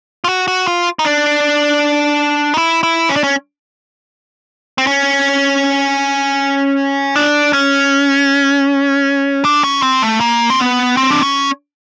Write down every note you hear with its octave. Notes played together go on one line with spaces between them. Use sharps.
F4
F#4
F#4
F4
D#4
D4
D#4
E4
E4
C#4
D4
C#4
C4
C#4
D4
C#4
D4
C#4
C4
A3
A#3
C4
B3
C4
D4
C#4